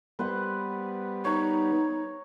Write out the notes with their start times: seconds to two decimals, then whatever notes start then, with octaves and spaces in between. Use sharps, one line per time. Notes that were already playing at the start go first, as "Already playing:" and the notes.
0.19 G3 B3 B4 C5 F#5
1.25 D#4 C#5 A#5